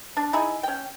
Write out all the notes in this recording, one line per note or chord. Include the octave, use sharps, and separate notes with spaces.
D4
D#4 E4 G#4
C#4 G5